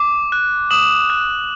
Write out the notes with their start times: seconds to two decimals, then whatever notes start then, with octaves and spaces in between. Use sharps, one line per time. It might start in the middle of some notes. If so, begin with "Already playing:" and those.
Already playing: D6
0.32 F#6
0.71 D#6 E7 F#7
1.10 F#6